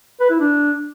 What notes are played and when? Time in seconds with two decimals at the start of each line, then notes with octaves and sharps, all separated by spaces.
0.20 B4
0.30 E4
0.40 D4